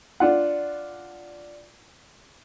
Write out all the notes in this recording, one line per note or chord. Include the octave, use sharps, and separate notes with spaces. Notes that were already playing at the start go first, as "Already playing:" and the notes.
D4 F4 F#5